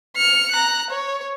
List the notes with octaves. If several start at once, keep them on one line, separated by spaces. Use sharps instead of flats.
F6 C#7
A#5 F#6
C#5